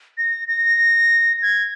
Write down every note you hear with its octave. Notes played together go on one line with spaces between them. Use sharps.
A#6
A#6
G#6